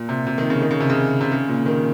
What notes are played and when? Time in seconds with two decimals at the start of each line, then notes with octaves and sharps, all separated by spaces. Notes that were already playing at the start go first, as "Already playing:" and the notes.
Already playing: A#2
0.09 C3
0.27 C3
0.38 D#3
0.50 C#3
0.62 D#3
0.71 C#3
0.80 C3
0.90 C#3
1.21 C3
1.32 C#3
1.48 A#2
1.66 D#3